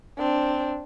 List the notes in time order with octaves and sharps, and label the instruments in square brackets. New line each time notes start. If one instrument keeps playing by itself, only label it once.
[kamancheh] C4 D4